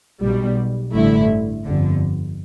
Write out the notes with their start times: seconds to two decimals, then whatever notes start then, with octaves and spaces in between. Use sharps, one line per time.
0.22 B1 B2 G3
0.93 A1 G2 D3 A3 E4
1.64 G1 F2 D3